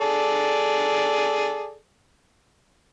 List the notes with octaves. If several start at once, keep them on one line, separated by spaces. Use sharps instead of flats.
G#4 A4 D5